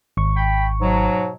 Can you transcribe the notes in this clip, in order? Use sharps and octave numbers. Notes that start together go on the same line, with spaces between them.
G#1 C#6
G5 B5
G#2 B2 F#3